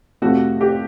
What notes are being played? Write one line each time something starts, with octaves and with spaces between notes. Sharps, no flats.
F2 C3 F3 A3 F#4
G4